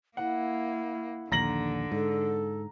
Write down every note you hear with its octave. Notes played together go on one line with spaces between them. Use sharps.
A#3 E4 F#5
A#1 D#2 D3 A#5 A#6 F#7
G#2 A4